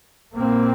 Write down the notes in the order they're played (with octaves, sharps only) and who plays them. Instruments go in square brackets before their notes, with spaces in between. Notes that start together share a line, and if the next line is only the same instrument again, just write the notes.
[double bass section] A#2 A#3 C4